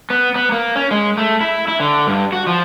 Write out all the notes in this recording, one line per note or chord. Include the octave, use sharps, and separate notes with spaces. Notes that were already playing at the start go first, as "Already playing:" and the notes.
B3
B3
A#3
C#4
G#3
A3
E4
E4
D3
G2
F#4
F3